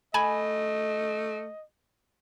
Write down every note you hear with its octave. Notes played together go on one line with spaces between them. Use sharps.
A3 D#5 G#5 B5